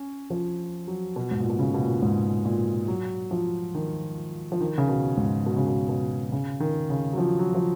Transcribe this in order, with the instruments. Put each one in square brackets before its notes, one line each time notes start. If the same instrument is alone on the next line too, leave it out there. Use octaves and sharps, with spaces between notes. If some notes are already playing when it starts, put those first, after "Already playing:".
Already playing: [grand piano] C#4
F3
F#3
B2
G#2
A#2
B2
C#3
B2
A#2
G#2
A#2
F#3
F3
D#3
F3
D#3
C#3
B2
G#2
B2
C#3
B2
B2
C#3
D#3
C#3
F#3
F3
F#3
F3